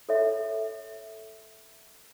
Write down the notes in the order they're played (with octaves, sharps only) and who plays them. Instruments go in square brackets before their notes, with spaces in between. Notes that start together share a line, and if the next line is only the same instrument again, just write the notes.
[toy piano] A4 C#5 E5